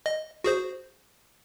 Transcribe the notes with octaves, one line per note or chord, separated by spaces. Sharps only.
D#5
F#4 G#4 C5